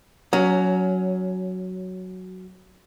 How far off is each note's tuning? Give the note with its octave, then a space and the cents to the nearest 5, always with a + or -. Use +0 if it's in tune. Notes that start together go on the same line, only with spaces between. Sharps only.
F#3 +0 C#4 +20